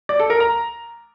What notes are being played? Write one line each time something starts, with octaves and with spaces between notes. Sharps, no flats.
D5
A4
A#4
A#5